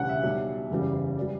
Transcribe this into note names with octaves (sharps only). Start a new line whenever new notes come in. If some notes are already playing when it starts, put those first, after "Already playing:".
Already playing: E1 D2 C#3 E3 G3 F#5
E5
B1 B2 G3
F#1 E2 C#3 E3 G3
E3 G3 D5